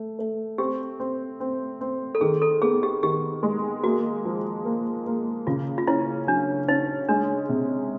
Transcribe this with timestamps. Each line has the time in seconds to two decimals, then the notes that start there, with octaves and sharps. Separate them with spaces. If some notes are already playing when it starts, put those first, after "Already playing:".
Already playing: A3
0.19 A3
0.58 C4 G4
1.00 C4
1.40 C4
1.81 C4
2.15 A4
2.21 D#3 G#4
2.42 A4
2.62 B3 G#4
2.83 G4
3.03 D#3 G4
3.43 G#3
3.84 A#3 F#4
4.25 F3
4.65 A#3
5.07 A#3
5.47 C#3 F4
5.78 F4
5.87 C#4 E4
6.27 F#3 D4
6.68 C#4 D#4
7.09 G#3 D4
7.49 C3